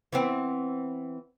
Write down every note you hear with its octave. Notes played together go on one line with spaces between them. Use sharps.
E3 B3 C4